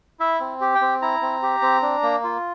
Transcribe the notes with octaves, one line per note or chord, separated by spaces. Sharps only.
E4 E5
C4
G4
G5
C4
E4 A#5
C4
G4
C4
D4
A#3
F4